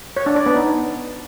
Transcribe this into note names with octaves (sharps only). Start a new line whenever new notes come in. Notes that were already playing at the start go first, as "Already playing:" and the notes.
C#5
D4
D5
B3
D#4